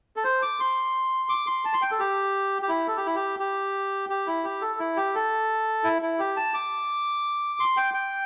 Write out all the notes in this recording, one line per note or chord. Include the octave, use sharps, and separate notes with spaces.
A4
C5
D6
C6
D6
C6
A5
C6
G5
A4
G4
G4
E4
A4
G4
E4
G4
G4
G4
E4
G4
A4
E4
G4
A4
E4
E4
G4
A5
D6
C6
G5
G5